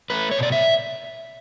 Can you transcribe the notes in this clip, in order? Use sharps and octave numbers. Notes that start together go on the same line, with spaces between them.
A3 B4
C#5
B2 D5
E5